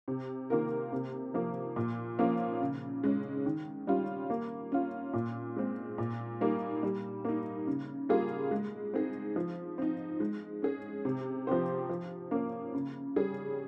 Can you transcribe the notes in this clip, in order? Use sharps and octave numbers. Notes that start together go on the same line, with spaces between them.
C3
D#3 A#3 F4 A#4
C3
F3 A#3
A#2
F3 A#3 C#4 F4
C#3
G#3 C#4
D#3
G3 C#4 F4
A#3
C#4 F4
A#2
G#3 C4
A#2
G3 A#3 D#4
G3
A#3 D#4
C#3
G3 A#3 F4 G#4
G#3
C4 D#4 G#4
F3
C4 D#4
G#3
C#4 G#4
C3
F3 C4 G4 C5
F3
A#3 C#4
C#3
G3 C#4 G#4